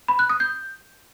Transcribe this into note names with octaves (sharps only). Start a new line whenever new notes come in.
B5
F#6
D#6
G6